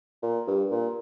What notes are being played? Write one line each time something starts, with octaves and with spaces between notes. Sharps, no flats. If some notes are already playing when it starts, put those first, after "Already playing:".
A#2
G2
A#2